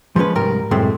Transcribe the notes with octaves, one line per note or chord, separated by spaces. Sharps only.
F3 G3 G#3 C#4 B4
C2 G#2 G3 A#4
C2 F#2 A2 G#3 A3 C4